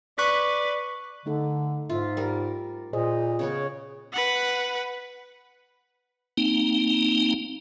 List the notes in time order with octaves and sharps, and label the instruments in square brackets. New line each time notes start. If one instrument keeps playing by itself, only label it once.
[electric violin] B4 [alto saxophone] D5 [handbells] C#6 F#6 B6
[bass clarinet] D3 [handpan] A3 D#4 A4
[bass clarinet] G#2 [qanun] F4 [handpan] E5
[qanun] G3 A#4
[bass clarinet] A#2 [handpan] G#4 C5 D#5
[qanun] C#3 B3 C#4
[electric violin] B4 F#5
[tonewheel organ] A#3 C4 D#4